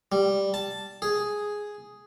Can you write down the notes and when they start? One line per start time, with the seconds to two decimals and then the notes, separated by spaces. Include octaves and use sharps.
0.12 G3
0.54 A5
1.02 G#4